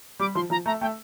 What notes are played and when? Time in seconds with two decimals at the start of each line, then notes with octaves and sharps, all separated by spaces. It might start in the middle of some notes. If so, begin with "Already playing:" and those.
0.19 G3 D6
0.35 F3 C6
0.50 F3 A#5
0.66 A3 A#5
0.81 A3 G5